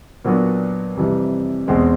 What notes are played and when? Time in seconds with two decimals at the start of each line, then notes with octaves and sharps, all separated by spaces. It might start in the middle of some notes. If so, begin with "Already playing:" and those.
0.25 A#2 F#3 B3 D4 F#4
0.96 F2 C3 E3 G3
1.68 E2 B2 G#3 C4